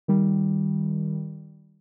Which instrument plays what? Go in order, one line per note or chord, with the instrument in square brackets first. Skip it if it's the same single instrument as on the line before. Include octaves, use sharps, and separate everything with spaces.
[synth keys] D#3 G3